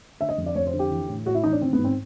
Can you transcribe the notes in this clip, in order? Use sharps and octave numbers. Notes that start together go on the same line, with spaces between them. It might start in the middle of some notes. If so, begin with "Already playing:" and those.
D3 E5
D#5
F2
D5
F2 C#5
C5
D3
G4
E3
A2
A2 F#4
E4
E3 D#4
D4
D#3 C4
B3
G#2
C4